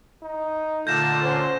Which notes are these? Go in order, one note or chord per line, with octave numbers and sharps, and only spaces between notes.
D#4
A#2 D3 A3 F4 G6 A#6 E7
C#4 C5